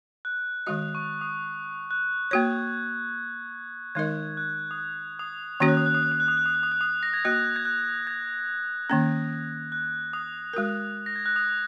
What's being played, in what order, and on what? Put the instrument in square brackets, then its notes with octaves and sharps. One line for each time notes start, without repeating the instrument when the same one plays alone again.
[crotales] F#6
[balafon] D#3 G#3 F#4 D#5 [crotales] D#6
[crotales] C#6
D#6
F#6
[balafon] A#3 F#4 C#5 [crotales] G#6
[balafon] D#3 G#3 D#4 A#4 D#5 [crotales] G#6
[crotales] F#6
D#6
F#6
D#6
[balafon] D#3 A#3 C#4 F#4 C#5 [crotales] D#6
[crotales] F#6
D#6
F#6
D#6
F#6
D#6
F#6
D#6
F#6
D#6
F#6
D#6
F#6
D#6
A#6
G#6
[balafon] A#3 F#4 D#5 [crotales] F#6
[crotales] G#6
F#6
G#6
[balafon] D#3 A#3 C#4
[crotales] F#6
D#6
[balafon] G#3 F#4 A#4
[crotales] A#6
G#6
F#6
D#6